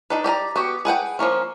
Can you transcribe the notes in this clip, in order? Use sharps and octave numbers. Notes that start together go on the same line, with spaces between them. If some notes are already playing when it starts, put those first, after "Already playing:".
D4 D#4 B4
G4 D5 D#5 A#5
B3 F#4 G4
G#4 B4 F#5 G5
F3 G#3 A#3 C#4